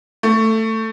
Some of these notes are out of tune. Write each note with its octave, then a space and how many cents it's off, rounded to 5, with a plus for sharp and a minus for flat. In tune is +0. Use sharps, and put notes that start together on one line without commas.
A3 +15